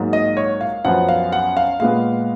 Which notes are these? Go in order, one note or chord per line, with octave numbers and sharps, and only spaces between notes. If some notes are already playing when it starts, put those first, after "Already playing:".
Already playing: G#2 F#3 A#3
D#5
C#5
F5
F#2 F3 B3 F#5
F5
F#5
F5
A#2 G#3 B3 F5